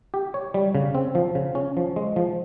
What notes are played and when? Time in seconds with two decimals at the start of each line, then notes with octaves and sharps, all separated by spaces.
0.14 G4
0.34 C#5
0.54 G3
0.75 C#3
0.95 C4
1.15 F3
1.35 C#3
1.55 C#4
1.77 F3
1.96 G#3
2.16 F3